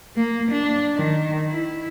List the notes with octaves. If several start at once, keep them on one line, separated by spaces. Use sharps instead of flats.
A#3
D4
D#3
E4